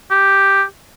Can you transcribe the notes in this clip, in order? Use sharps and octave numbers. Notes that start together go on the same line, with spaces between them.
G4